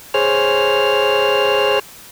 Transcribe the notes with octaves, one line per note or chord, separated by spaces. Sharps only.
G#4 C5 C#5 F6